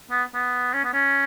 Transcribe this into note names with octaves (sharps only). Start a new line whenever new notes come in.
B3
B3
C#4
B3
C#4